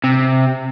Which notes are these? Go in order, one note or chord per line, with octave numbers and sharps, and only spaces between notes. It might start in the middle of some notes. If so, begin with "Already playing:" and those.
C3